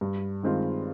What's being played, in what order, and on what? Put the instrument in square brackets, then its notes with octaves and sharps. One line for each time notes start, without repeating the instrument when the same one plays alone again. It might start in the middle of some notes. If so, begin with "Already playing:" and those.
[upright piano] G2
D#3 G#3 C4 F4